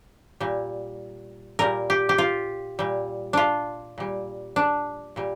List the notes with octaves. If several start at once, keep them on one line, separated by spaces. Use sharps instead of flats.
A#2 G3
A#2 G3 A#4
G4
G4
F4
A#2 G3
D4 F4
A#2 G3
D4
A#2 G3